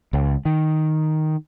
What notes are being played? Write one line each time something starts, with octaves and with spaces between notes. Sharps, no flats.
C#2
D#3